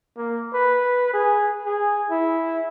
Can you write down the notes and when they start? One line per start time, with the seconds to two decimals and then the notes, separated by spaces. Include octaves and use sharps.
0.17 A#3
0.54 B4
1.13 G#4
1.65 G#4
2.10 E4